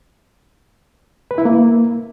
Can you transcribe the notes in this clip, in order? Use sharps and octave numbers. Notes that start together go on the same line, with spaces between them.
B4
E4
A#3